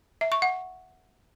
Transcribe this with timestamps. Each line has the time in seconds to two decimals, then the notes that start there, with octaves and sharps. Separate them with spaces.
0.21 E5
0.32 C#6
0.42 F#5